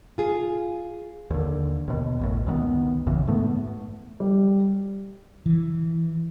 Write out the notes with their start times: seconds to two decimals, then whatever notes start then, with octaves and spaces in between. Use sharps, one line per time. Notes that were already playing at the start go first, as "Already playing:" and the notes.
0.18 F4 G#4
1.30 D#2 D3
1.88 D#2 B2
2.19 A1 F#2 A2
2.47 C#2 D#3 G3 B3
3.06 B1 F#2 C#3 E3
3.27 G#2 A3 B3
4.20 G3
5.46 E3